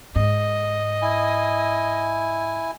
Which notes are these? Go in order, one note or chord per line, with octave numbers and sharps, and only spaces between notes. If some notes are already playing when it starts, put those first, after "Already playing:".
G#2 D#5
E4 G#5